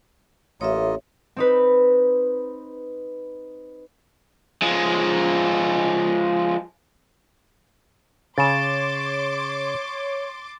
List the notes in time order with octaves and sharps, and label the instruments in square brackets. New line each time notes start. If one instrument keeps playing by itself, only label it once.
[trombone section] A1 [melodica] A#3 F4 D#5 [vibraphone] C#5 E5
[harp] C4 D#4 B4
[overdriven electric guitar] F3 G#3
[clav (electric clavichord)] C#3 [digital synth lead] C#5 [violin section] C6 D6 [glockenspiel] A6 E7